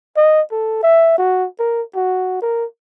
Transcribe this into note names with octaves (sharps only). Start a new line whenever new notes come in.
D#5
A4
E5
F#4
A#4
F#4
A#4